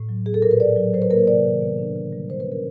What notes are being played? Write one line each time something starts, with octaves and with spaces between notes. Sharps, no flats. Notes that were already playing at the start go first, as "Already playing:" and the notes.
Already playing: A2
F#3
B3 G#4
A4
A#2 A#4
B4
A#2 D5
F#3
F#3 C5
B4
A#3 A#4
C5
C3 D5
D#3
B3
D4
D3
G3
A#3 C5
B4
C#4 A#4